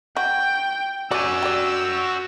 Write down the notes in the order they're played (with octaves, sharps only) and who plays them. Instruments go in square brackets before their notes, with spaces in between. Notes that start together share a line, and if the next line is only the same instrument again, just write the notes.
[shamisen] F#4 [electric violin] G5
[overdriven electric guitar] F#4 G#5 [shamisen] D5 [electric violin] E6
[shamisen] G4 D5